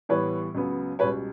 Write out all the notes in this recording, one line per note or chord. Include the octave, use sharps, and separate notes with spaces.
A2 E3 G3 B3 B4 C#5
C#2 C#3 F#3 B3
C#2 B2 G3 B4 C#5